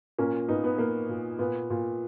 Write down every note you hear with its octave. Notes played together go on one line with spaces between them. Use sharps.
A#2 A#3 C#4
A#2 B3 D#4
B3
A#2 A#3
A#2
A#2 B3
A#2